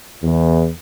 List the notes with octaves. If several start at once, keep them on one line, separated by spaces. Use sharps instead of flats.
E2